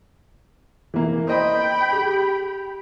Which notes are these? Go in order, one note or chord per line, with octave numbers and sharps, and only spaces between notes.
E3 A#3
C5 D#5 G5 B5
G4 G#4